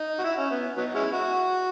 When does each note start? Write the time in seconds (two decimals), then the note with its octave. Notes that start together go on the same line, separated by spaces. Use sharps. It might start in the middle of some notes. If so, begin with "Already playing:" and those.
Already playing: D#4
0.19 F#4
0.24 E4
0.37 C#4
0.51 B3
0.77 F#3 B3 D#4
0.95 G#3 C#4 E4
1.13 F#4